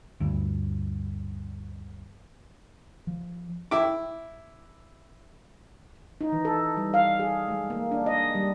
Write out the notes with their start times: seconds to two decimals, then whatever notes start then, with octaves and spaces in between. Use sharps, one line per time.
0.20 D2 G2
3.07 F3
3.71 E4 D6
6.21 D#4
6.33 E3
6.45 A4
6.77 G3
6.94 F5
7.20 G#4
7.48 G#3
7.70 A#3
7.92 D4
8.06 D#5
8.35 G3